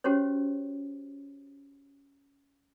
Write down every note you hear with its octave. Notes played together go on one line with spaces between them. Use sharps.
C#4 F#4 G4 C5 C#5